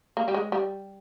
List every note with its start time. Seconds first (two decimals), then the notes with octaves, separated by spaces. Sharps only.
0.17 A#3
0.28 G3
0.34 G#3
0.52 G3